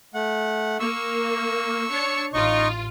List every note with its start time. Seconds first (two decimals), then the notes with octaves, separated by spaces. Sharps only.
0.14 A3 F#5
0.80 A#3 C#6 E6
1.91 D4 C#5 C#7
2.33 A1 D#4 F4 D#5 C#6